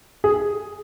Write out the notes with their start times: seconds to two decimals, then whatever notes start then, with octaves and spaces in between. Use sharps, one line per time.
0.24 G#4